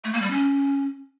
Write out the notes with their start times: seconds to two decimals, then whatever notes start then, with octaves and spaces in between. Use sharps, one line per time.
0.04 A3
0.13 A#3
0.22 G3
0.30 C#4